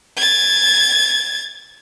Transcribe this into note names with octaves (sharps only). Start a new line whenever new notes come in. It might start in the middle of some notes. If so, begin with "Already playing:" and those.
G#6 A6